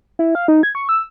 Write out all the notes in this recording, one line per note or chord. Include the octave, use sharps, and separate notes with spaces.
E4
F5
D#4
G#6
C#6
E6